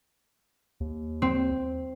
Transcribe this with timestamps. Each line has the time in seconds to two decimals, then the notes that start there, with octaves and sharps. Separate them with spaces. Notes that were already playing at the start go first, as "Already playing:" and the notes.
0.80 D#2
1.22 C4